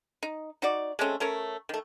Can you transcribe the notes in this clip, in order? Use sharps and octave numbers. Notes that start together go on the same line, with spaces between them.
D#4
D#4 F#4 D5
G#3 A3 C4 C#4
A3 C#4 A#4 C#5
D#3 A3